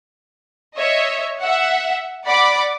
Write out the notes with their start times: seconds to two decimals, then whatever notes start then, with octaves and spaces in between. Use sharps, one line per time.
0.78 C#5 D#5 E5
1.42 E5 F#5
2.25 D5 F#5 B5 D6